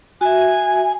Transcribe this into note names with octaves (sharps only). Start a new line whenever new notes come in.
F#4 E5 G#5